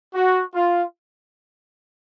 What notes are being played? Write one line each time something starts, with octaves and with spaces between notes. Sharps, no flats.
F#4
F4